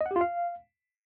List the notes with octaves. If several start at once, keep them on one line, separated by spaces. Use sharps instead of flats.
D#5
F#5
G4
F4
F5